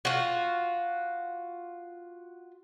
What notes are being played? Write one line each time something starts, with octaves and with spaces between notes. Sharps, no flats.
F4 F#4